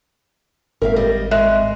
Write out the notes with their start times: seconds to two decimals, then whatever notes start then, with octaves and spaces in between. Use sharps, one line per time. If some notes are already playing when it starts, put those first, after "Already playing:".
0.82 G#1 A#4 E5 F5
0.96 G3 D#5
1.31 G#3 E5 F#6